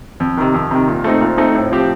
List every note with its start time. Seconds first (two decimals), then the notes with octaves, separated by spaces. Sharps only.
0.20 F2
0.37 C3 D#3
0.54 F2
0.71 C3 D#3
0.88 A#2
1.04 A3 C4 D#4
1.21 A#2
1.38 A3 C4 D#4
1.55 A2
1.72 F3 C4 G4